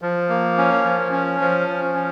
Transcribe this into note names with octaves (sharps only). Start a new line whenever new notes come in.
F3
A#3
C#4
F3
C#4
F3
F3
C#4